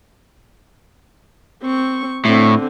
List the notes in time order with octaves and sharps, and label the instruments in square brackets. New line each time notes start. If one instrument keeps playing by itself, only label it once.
[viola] C4 C#6
[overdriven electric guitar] A2 [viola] D3 C4